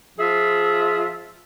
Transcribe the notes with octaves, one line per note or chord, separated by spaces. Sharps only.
F3 F4 G#4 E5